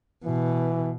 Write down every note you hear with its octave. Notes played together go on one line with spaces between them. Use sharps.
B2 E3